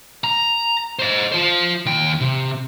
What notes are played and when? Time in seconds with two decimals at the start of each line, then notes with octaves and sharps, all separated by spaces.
0.24 A#5
0.99 C5 D#5
1.32 F4 C5
1.86 D#2 G5
2.21 C3